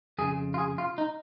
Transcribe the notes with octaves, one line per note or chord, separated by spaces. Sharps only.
F2 C#3 G#4
F4
G#4
F4
D#4